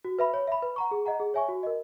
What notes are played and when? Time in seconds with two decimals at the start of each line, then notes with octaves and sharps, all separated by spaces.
0.05 F#4
0.19 B4 E5 B5
0.34 C#5
0.47 E5 B5
0.62 B4
0.76 F#5 A#5 C#6
0.91 G#4
1.06 D#5 F#5 A#5
1.20 G#4
1.34 C#5 E5 G#5 C#6
1.49 F#4
1.63 A#4 D#5